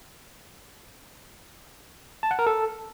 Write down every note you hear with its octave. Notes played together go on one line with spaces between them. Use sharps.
A5
F#5
A#4
A4